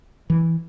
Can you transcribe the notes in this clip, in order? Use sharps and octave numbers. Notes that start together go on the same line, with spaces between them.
E3